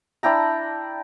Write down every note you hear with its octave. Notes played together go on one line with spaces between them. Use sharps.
D4 E4 G5 A#5